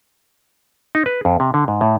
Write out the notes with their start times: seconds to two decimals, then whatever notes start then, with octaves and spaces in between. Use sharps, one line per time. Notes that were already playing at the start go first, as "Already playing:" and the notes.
0.95 D#4
1.06 B4
1.25 F2
1.40 C3
1.54 D3
1.68 G#2
1.81 A2